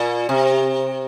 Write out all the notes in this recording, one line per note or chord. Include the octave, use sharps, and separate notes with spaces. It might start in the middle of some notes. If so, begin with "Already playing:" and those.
Already playing: A#2
C3